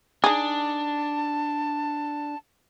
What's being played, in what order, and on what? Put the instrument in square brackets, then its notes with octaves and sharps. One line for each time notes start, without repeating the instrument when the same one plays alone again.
[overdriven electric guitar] D4 [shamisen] D#4 G#4 [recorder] A5